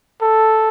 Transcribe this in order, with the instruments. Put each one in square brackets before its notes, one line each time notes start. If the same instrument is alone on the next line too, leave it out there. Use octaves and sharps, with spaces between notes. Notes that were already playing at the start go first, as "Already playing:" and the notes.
[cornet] A4